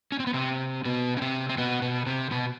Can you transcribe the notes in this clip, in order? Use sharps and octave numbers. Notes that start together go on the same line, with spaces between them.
C#4
C4
B3
C3 C4
B2 B3
C#4
C3 C4
C4
B2 B3
B2 B3
C3 C4
B2 B3